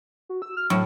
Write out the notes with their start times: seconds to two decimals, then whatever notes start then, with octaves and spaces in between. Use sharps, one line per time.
0.29 F#4
0.42 E6
0.57 F6
0.70 A2 F#3